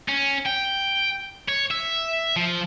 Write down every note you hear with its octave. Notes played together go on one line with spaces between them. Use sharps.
C#4
G5
C#5
E5
F3